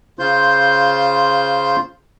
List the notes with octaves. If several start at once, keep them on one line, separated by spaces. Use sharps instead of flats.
C#3 F4 C5 C6 G6